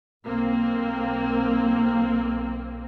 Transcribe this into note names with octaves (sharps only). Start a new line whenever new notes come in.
B1 A#3 C4